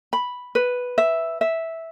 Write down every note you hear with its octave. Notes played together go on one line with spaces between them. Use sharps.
B5
B4
E5
E5